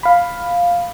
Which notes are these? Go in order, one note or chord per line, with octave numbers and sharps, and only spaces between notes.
F5 B5